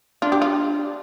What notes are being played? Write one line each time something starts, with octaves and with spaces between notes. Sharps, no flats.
D4 F4
G4
F4